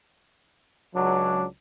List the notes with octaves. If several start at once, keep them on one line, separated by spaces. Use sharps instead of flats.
C#2 F#3 D4